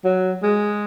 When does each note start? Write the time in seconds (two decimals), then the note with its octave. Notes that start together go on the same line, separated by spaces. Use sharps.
0.04 F#3
0.43 G#3